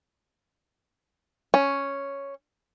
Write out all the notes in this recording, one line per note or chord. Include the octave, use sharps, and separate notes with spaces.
C#4